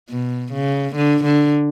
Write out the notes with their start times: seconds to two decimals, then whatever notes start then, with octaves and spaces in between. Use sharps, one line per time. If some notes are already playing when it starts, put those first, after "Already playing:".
0.10 B2
0.53 C#3
0.96 D3
1.25 D3